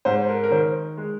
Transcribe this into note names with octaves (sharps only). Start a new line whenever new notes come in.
G#2 C5
A#4
A#4
D#3 C5
G#3